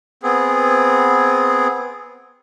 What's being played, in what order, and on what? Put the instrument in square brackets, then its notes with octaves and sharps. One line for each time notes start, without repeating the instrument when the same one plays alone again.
[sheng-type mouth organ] B3 C4 G#4